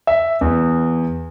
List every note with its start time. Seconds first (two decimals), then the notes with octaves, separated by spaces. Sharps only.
0.07 E5
0.41 E2